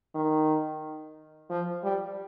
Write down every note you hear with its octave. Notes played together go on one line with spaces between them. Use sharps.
D#3
F3
G3